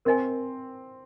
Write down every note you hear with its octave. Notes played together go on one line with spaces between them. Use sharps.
C4 A#4 D#5 G#5